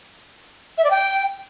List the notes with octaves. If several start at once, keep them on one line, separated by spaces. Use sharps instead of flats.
E5
D5
G5